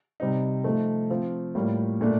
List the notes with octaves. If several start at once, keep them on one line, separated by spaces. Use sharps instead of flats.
C3 G3 C4 D#4
F3 A3 D#4
F3 C4 F4
A2 G3 A#3 F4
A#2 A3 D4